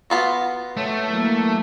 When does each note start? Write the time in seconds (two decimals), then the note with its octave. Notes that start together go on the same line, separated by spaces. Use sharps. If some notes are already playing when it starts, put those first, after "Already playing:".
0.10 B3 F4 F#4
0.77 A3 C#5
1.08 E3 F#3 A#3